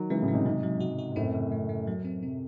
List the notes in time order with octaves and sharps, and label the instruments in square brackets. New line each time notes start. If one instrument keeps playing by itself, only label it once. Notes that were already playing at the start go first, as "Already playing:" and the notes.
Already playing: [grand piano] D#3 F#3
[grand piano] C#3 E3 [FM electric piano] G#3
[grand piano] A2 C#3
[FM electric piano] G#3
[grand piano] G#2 C3
[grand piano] G#2 C3 [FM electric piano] F#3
[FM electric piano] F#3
F#4
F#4
[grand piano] G#2
[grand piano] F#2 A2 [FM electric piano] C4
[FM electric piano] C#3
A3
A3
F#3
C4
[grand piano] C3 [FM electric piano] C4